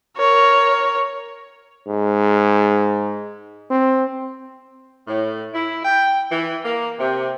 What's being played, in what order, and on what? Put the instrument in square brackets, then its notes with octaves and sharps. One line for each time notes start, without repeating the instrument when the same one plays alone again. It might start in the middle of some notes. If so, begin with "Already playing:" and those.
[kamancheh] A#4 C#5
[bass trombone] G#2
C4
[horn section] A2
E4
G5
E3
A#3
C3